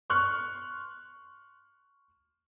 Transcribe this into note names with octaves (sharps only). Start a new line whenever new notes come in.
C6 C#6 F6 F#6